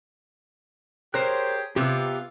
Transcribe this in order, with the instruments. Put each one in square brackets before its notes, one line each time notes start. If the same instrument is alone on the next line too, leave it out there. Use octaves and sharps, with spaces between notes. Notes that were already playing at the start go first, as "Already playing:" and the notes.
[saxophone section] G4 G#4 [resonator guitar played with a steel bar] A#4 C5 [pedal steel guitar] C#5 F#6
[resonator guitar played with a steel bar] C3 [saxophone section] B3 F4 [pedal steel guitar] G4 D6 E6